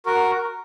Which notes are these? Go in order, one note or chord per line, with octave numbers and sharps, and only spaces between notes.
F#4 A#4